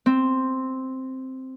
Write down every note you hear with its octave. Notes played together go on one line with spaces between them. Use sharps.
C4